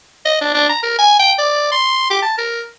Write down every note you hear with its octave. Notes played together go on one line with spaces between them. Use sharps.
D#5
D4
D4
A#5
A#4
G#5
G5
D5
C6
G4
A5
A#4